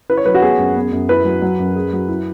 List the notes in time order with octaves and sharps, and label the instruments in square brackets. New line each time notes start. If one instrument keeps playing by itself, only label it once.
[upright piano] E4 [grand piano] B4
[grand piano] C#5
[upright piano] F#3 [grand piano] B4
[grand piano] F#4
[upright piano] B3 [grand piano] G#4
[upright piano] F#2
B3
F#2
[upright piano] E4 [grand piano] B4
[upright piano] F#3
F#3
F#2
G#4
F#3
E4